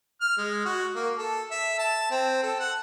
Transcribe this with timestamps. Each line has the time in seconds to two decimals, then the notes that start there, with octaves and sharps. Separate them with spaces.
0.21 F6
0.38 G#3
0.66 F#4
0.95 A#3
1.18 A4
1.51 E5
1.79 A5
2.11 C4
2.43 A4
2.60 F#5